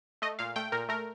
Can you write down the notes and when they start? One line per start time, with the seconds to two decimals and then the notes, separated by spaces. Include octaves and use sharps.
0.22 A3 D#5
0.39 A#2 F5
0.56 A3 G5
0.72 A#2 A#4
0.89 A3 A#4